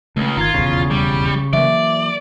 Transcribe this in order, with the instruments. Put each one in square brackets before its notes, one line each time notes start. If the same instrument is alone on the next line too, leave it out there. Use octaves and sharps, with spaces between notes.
[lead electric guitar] C#2 C#3 [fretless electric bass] A3 C#4
[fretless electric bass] G1 D#3 [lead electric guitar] F4 [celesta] A#5 G#6
[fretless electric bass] D#1 B1 E2 [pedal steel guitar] C#3
[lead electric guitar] G3
[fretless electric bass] E3 F#3 A#3 [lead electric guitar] D5 [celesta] E5